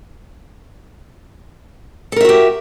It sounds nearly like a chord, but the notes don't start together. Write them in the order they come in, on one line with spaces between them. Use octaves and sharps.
A4 A#4 E5 F#4 G4